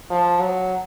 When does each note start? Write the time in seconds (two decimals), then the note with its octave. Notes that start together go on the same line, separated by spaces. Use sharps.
0.10 F3
0.41 F#3